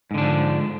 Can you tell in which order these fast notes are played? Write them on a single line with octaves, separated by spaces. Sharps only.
G#2 D3 D4 F3